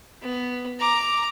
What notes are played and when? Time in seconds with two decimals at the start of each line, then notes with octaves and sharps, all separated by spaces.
0.22 B3
0.80 A#5 D6